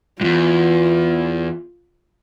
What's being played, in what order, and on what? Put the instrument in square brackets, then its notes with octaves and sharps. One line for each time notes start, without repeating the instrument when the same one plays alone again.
[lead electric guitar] E2 G2 [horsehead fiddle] F4